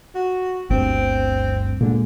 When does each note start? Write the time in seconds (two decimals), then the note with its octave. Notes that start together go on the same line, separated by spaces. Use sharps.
0.15 F#4
0.70 G1 D2 G2 C4
1.80 A#2 D3 G#3